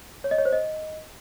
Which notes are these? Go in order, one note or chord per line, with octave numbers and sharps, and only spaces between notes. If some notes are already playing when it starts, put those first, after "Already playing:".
C#5
D#5
C#5
C5
D#5